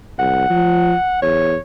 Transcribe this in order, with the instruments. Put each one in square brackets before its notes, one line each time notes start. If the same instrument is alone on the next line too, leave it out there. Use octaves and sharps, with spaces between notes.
[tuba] C2 [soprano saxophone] F#5
[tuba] F3
[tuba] E2 [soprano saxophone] C#5